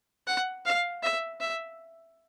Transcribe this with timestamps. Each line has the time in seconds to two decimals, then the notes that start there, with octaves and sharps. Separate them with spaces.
0.27 F#5
0.66 F5
1.04 E5
1.41 E5